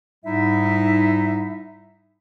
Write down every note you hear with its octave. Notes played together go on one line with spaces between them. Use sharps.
G#2 G3 D#4 E4 E5